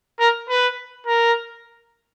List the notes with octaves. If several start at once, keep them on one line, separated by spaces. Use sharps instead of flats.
A#4
B4
A#4